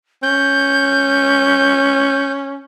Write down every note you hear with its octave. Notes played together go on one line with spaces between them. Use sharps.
C#4 G6